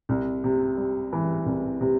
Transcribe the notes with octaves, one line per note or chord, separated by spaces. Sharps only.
C2
C3
G3
E3
C2
C3